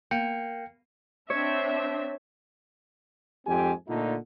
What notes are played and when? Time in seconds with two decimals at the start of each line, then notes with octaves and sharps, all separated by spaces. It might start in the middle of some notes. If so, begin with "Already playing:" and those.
0.11 A#3 G5 C#7
1.30 C4 D4 C#5 E5
3.46 F2 G#2 C4 G4 G#5
3.88 A#2 D3 A3 D#4 F4